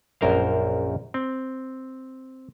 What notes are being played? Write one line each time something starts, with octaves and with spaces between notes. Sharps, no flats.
A#1 F#2 A#4 C5 F5
C4